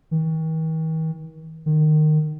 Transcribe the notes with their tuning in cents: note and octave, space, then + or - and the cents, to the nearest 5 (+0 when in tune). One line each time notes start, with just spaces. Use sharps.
D#3 +45
D#3 -20